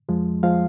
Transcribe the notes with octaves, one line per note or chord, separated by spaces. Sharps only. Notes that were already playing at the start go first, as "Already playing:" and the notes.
F2 F3 G#3
F3 G#3 F5